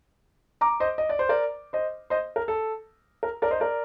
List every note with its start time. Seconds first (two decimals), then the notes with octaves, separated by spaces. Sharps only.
0.61 A#5 D6
0.80 C5 D#5
0.98 D#5
1.09 D5
1.19 C5
1.29 A#4 D5
1.73 C5 D#5
2.10 C5 D#5
2.36 A#4
2.48 A4
3.23 A#4
3.42 A#4 D5
3.51 C5 D#5
3.60 A#4 D5